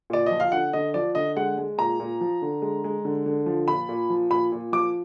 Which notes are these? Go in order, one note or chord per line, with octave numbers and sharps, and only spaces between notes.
A#2 D5
F3 D#5
F5
D3 F#5
D3 D#5
F3 D5
D3 D#5
G#3 F#5
G#3
A#2 A#5
A#2
F3
D3
G#3
G#3
D3
D3
F3
A#2 B5
A#2
F3
A#2 B5
A#2
F3 D6